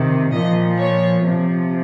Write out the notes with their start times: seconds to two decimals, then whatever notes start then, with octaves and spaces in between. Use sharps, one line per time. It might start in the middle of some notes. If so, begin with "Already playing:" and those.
Already playing: C3 D#3
0.32 A#2 F3 D#5
0.79 C#5
1.26 C3 F3